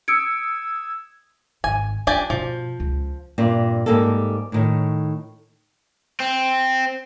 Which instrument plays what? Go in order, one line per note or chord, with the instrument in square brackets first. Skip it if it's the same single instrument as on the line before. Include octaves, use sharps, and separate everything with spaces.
[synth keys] D#6 E6 G#6 [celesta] C#7 D7
[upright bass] G#1 [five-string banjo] G#5
[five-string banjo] D4 G4 G#5 [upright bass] D#4 F4
[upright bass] B2 [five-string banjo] F3
[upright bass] C#2
[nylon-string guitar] G2 A#2 C4
G#2 G3 A#3 C4 A4
A2 D#3 C#5
[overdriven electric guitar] C4